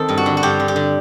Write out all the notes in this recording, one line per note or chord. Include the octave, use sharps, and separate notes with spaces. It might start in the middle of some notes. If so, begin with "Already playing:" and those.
Already playing: D#3 C4 A4
G2
F#4
D3
F#4
G2 G4
D3
G4
D3